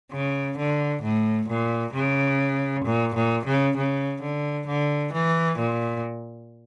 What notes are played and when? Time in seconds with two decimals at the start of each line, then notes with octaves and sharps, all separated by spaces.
0.12 C#3
0.57 D3
1.03 A2
1.49 A#2
1.94 C#3
2.85 A#2
3.15 A#2
3.46 C#3
3.77 C#3
4.22 D3
4.67 D3
5.14 E3
5.59 A#2